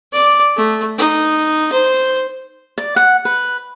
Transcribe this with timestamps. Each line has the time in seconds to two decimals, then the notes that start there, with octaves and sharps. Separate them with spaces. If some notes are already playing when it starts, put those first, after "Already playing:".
0.12 D5 D6
0.56 A3
0.98 D#4
1.72 C5
2.78 D5
2.96 F#5
3.25 B4